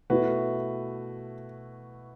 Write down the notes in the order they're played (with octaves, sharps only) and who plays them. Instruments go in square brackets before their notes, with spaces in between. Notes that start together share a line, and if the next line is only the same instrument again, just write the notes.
[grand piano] B2 A3 E4 F#4 B4